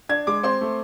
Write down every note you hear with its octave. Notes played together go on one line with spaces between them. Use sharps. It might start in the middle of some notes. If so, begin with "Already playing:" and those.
D4 G#6
G#3 D6
C4 C6
A3